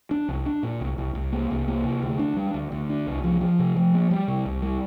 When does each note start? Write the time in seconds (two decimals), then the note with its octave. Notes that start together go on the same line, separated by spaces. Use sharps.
0.11 D4
0.28 C2
0.46 D4
0.63 A#2
0.81 C2
0.98 C2
1.15 C2
1.32 A#3
1.50 C2
1.68 A#3
1.84 C3
2.02 D2
2.19 D4
2.37 G3
2.54 D2
2.72 D2
2.90 D4
3.07 C2
3.24 F3
3.41 F3
3.59 C3
3.77 F3
3.94 A#3
4.11 G3
4.28 C3
4.46 C2
4.62 G3